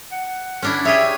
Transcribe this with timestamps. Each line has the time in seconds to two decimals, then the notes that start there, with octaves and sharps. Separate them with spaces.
0.12 F#5
0.62 C#4 D4 E4
0.85 G4 G#4 C#5 E5